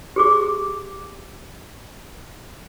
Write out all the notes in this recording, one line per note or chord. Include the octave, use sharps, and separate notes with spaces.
G4 G#4 D6